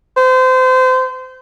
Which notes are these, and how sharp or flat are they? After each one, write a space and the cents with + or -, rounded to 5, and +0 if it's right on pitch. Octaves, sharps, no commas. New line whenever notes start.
C5 -30